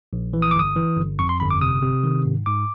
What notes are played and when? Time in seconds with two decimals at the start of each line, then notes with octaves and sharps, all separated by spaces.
0.13 A#1
0.33 E3
0.42 D#6
0.51 D6
0.56 G1 D#6
0.76 E3
0.97 G1
1.19 F2 C#6
1.29 C6
1.40 G1 B5
1.51 D6
1.62 C3 D#6
1.82 C3
2.04 D#3
2.25 G#2
2.46 G#2 D6